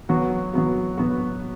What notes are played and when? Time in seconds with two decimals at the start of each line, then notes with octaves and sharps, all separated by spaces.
0.09 F#3 B3 F#4
0.53 F#3 B3 F#4
0.97 F#3 B3 F#4